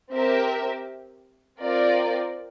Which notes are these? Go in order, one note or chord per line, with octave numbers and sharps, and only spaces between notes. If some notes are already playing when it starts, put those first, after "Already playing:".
C4 G4 A#4 E5
C4 F4 A#4 D5